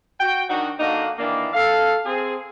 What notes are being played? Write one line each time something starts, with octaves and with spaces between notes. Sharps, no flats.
F#4 G5
D#3 D4 D#4 F#4
D3 A#3 D4 D#4 F#4
D#3 E3 A#3 D4
A4 F5
C4 G#4